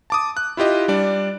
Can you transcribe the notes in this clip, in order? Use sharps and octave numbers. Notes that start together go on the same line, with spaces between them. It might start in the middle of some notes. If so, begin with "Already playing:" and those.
A5 D6 D#6
F#6
E4 F4 G4 D#5
G3 D4 D5